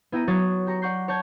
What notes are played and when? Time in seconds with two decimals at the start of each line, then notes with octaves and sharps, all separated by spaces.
0.12 B3 E4 G5 A#5 D#7
0.27 F#3 B3 C#5 D#6 G#6 A6
0.67 G4 A#5 C#6
0.82 D5 F#5 C#6 G6 C7
1.08 C#5 A5 G6 G#6